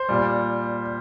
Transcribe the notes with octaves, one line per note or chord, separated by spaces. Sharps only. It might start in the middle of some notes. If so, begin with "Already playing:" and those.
Already playing: C5
A#2 G3